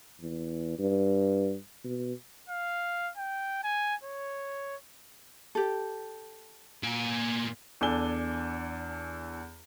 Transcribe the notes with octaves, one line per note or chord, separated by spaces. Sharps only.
E2
G2
B2
F5
G5
G#5
C#5
G4 A4
A#2 G#5
E2 D4 A4 G#5 G7